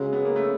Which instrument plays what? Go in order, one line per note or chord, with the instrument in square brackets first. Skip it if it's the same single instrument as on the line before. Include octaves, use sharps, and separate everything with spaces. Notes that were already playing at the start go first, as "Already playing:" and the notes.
Already playing: [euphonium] C#3 [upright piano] F#3 G#3
[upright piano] B3
A#3
A3 B3